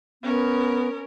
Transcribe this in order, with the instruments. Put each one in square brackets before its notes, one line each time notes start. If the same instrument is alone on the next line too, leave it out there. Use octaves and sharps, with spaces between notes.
[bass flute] B3 [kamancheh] C#4 A#4